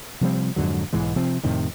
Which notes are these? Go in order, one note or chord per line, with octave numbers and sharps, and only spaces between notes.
C3 F3 G3 C4
F2 G#2 D3 F#3
B1 G#2 E3 G#3
C3 F3 C4
F2 A2 C3 D#3